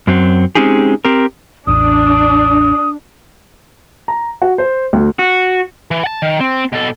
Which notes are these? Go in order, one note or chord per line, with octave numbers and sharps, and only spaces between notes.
F#2 F#3 C4
G#3 C4 C#4 D#4 G4 G#4
C4 G4 A#4
A1 E2 D4 D#6
A#5
F#4
C5
D2
F#4
E3
F#5 A5
D#3
C4
B2 A4